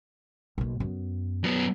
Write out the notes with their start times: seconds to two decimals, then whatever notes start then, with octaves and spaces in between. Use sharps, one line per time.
0.58 B1 A#3
0.80 F#2 B3
1.44 F#2 B3